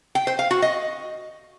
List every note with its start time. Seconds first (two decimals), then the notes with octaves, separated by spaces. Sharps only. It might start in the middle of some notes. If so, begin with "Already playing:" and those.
0.15 G5
0.27 C5
0.39 F5
0.51 F#4
0.62 D#5